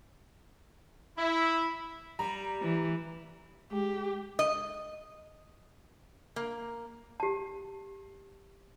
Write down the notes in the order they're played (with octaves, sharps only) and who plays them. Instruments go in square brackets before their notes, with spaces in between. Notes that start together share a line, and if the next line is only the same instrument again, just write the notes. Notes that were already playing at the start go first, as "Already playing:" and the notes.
[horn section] E4
[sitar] G3 [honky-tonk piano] A#5
[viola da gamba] E3
[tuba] G#3 [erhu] G4
[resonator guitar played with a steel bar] D#5
A#3
[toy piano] G4 A5